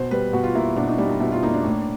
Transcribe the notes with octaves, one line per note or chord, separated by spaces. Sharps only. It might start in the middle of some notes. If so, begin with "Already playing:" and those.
Already playing: B2 C5
G3 B4
B2 F#4
F4
A#3 E4
B2 D4
D#4
G3 D4
D#4
B2 E4
F4
A#3 D#4
D4
A2